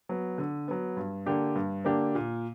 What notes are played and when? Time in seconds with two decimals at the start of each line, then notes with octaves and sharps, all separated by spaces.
0.09 F#3 B3
0.38 D3
0.68 F#3 B3
0.97 G2
1.26 D3 A#3 D4 G4
1.55 G2
1.85 D3 A#3 D4 G4
2.15 A#2